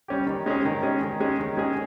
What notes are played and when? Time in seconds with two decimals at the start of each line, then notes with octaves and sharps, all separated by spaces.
0.08 G3 C#4 G4
0.27 D#3
0.46 G#3 C#4 G#4
0.65 D#3
0.83 G#3 C#4 G#4
1.02 D#3
1.20 G#3 C#4 G#4
1.40 D#3
1.57 G#3 C#4 G#4